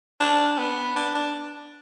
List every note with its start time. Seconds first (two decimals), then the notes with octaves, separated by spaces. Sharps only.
0.20 D4
0.58 B3
0.96 D4
1.15 D4